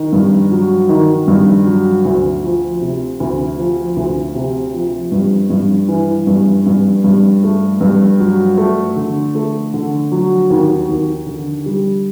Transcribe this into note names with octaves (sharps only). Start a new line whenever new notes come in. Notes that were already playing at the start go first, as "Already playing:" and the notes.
Already playing: D#3
G2
F#3
D#3
G2
F#3
D2
F3
C3
D2
F3
D2
C3
F3
G2
G2
E3
G2
G2
G2
A3
G2
F#3
A3
D3
A3
D3
F#3
D#2
D#2
D3
G3